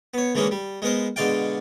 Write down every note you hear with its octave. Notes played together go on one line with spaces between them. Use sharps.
B3 C#5
D3 E3 G#3 A#3 C#4 D#4
G3
G#3 B3 A#4 C5
B2 D3 G#3 D5 F5 G5